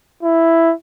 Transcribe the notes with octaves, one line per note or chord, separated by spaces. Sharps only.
E4